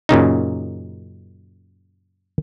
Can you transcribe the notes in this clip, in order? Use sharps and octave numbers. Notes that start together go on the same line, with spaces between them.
F#2 A#2 C#3 D#4